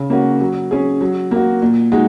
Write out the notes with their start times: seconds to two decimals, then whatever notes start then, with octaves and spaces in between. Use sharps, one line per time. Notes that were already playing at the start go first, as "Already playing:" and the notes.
Already playing: C#3
0.10 A#3 C#4 F#4
0.41 F#3
0.71 C#4 G#4
1.01 F#3
1.31 A#3 F#4
1.62 A#2
1.92 G#3 D#4 F#4